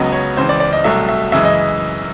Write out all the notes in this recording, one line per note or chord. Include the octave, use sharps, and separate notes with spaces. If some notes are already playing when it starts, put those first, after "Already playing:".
Already playing: C#2 C#3 F#3 B3 D#5
C#5
C#2 C#3 E3 C5
D5
D5
D#5
C2 B2 F#3 A3 E5
E5
F#2 C#3 E3 G#3 E5
D#5